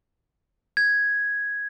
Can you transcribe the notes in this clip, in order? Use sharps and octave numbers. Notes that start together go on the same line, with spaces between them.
G#6